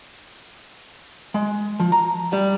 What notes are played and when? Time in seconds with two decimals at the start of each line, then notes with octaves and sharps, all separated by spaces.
1.34 G#3
1.80 F3
1.92 A#5
2.33 G3